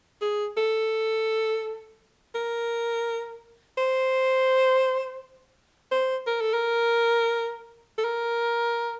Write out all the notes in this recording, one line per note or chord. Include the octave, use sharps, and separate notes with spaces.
G#4
A4
A#4
C5
C5
A#4
A4
A#4
A4
A#4